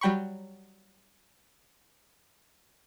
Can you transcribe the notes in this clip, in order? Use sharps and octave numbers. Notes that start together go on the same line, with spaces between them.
F#3 G3 G5 B5 C#6